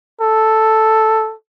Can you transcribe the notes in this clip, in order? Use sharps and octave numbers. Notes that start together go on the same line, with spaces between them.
A4